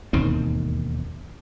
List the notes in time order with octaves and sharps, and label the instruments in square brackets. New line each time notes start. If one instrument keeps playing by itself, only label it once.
[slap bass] E1 D#2 G#2 C4